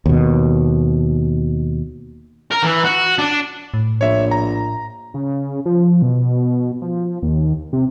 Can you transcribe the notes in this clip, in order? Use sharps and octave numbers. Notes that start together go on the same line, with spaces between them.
D#2 B2
A#4
E3
F#4
D4
A2
A#1 C#5 E5
A#5
C#3
F3
B2
F3
D#2
C3